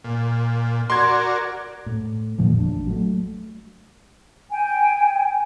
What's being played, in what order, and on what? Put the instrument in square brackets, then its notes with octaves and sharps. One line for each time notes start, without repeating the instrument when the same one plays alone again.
[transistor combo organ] A#2
[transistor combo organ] F#4 A#4 D5 [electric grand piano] C6 G#6
[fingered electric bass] A2
F2 A#2 D#3 F3
A1 D4
F#3 A3
[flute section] G5 G#5